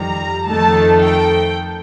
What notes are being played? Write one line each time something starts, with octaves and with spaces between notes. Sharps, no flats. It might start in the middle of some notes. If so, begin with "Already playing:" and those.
Already playing: F2 D#3 G3 A#5
F2 D#3 A3 A5
G5